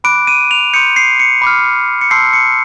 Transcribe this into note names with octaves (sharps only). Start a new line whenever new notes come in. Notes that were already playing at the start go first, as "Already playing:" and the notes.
B5 D6 F#6 D7
D#7
F7
C6 D#6 G6 C#7
C7
C#7
B5 D6 F6
C#7
A5 C6 E6 G6 C7
C#7